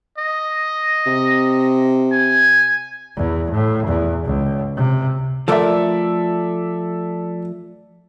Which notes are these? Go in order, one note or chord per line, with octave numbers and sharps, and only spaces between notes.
D#5
C3
G#5
E2
A2
E2
C#2
C3
F3 A3 A4 A#4 D5 E5